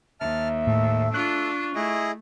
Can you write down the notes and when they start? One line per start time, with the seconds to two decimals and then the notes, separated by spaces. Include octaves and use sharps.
0.20 D#2 E5 A5 F6
0.67 A2 A3
1.14 D4 F4 C#6 F#6
1.75 A3 E4 G#4 D#5